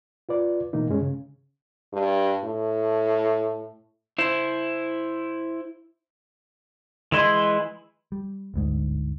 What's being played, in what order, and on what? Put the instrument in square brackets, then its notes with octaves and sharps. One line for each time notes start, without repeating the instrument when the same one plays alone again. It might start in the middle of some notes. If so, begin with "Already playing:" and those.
[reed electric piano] F4 B4 D5
B2 E3 A#3 D#4
G2 G#3 C#4
C#3
[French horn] G2
A2
[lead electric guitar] E4 C5
[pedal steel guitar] E3 G#3 E4 D#5 C6
[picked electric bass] G3
G1 D2 G#2